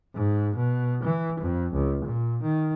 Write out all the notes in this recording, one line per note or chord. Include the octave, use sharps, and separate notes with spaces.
G#2
B2
E3
F2
C#2
A#2
D#3